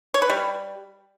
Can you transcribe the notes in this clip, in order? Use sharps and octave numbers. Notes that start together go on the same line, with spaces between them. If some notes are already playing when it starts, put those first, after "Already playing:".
C#5
B4
G3